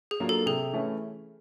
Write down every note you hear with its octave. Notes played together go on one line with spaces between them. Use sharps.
G#4
F#3 A#3 D4 F4
A4
C3 G#4
E3 A3 C#4 E4